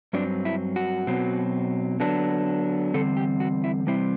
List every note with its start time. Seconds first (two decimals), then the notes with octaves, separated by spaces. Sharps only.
0.13 G2 F#3 C4 D4
0.45 E4
0.76 F#4
1.07 B2 F#3 C4
2.00 D3 F#3 B3 D4
2.94 E2 D3 G3 C4 A4
3.17 G4
3.40 F#4
3.64 E4
3.87 C3 E3 G3 C4 E4